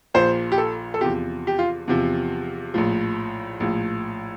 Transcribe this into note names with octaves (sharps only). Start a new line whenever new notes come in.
A#1 A#2 F3 C5
G4
A4
A4
E2 C3 F3 G4
G4
F4
E2 C3 F3
A#1 A2 F3
A#1 A2 F3